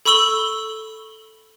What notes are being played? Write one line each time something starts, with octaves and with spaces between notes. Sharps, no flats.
A4 B5 C#6 E6 F#7 G7